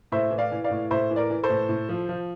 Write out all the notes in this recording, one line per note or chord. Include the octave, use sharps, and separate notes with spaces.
A2 C5 E5
E3
D5 F5
E3
D5 F5
A2
A2 C5 E5
E3
A#4 D5
E3
A4 C5
A2
A2
F3
F3